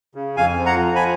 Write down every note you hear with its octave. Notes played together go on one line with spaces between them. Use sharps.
C#3
F2 F5 G#5
F3
F#5 A#5
F3
G#5 B5